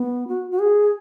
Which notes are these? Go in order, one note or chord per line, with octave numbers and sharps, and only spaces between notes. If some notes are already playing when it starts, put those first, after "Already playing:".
Already playing: B3
F#4
F#4
G#4